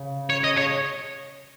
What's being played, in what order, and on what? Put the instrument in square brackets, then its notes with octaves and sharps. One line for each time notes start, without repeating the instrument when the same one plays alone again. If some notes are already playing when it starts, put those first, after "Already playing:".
Already playing: [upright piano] C#3
[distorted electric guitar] C#5
D#5
C#5